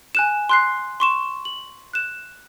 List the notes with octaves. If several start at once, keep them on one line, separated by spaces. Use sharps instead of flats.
G#5 F#6 E7
C6 F#6 C7
C6 C#6 E7
F#7
F#6 E7